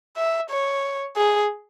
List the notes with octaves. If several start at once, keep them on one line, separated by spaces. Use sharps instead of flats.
E5
C#5
G#4